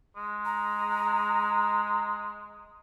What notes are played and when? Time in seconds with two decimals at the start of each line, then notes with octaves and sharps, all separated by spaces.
0.16 G#3
0.45 A#5